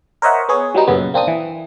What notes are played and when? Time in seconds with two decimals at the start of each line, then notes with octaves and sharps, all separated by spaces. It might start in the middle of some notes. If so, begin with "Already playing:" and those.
0.22 A#4 C5 C#5 D#5 E5 F#5
0.49 B3 G#4 C#5
0.75 F#3 G3 B3 D#4
0.87 F#2 A#2 C#3 B3
1.14 A#3 C4 D4 D#6
1.28 E3